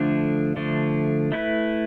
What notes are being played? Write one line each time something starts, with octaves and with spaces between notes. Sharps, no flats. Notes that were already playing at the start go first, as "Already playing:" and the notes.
Already playing: D3 F3 A3 D4
D3 F3 A3 D4
A3 E4 B4